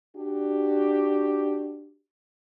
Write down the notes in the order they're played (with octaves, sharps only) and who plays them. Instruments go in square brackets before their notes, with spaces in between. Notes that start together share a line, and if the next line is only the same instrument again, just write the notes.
[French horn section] D4 F#4 G4